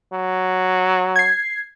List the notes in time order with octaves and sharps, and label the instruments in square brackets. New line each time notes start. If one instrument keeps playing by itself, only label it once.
[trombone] F#3
[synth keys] G#6 C7